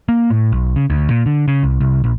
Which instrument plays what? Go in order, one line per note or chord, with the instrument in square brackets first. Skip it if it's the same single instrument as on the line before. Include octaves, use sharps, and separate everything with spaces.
[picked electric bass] A#3
A2
B1
C#3
D2
A#2
D3
C#3
C2
C2
A#1